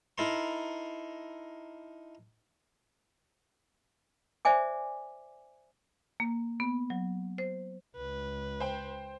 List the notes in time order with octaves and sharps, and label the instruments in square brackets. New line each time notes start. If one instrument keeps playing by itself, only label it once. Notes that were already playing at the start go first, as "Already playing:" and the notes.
[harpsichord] D#4 E4 A4 A#4 C6
[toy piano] C5 D5 E5 G#5 D6
[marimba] A#3
B3
F#3
C5
[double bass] C#2 [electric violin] B4
[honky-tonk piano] C5 G5